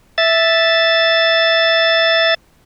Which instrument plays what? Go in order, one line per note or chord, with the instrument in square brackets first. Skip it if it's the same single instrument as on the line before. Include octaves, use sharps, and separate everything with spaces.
[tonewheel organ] E5 A6